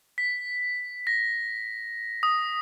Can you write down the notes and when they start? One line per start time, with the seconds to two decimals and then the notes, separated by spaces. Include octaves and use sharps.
0.18 B6
1.07 A#6
2.23 D#6